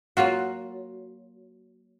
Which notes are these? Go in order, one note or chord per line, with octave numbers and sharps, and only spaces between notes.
F#3 A#3 F4 F#4